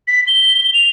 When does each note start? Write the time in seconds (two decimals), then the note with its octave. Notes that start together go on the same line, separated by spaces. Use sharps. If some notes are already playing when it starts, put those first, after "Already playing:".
0.08 B6
0.27 G7
0.74 F7